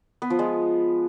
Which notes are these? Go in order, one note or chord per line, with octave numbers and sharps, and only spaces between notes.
B3
F3
G#3